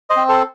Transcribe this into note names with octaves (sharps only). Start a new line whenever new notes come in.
C5 D#5
C4
A4 C5